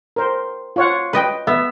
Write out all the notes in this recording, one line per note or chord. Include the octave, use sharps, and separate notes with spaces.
A#4 C5
F4 C#5 F#5
B4 D#5 G5
B3 E5